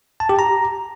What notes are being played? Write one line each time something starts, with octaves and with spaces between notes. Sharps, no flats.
A5
G4
A#5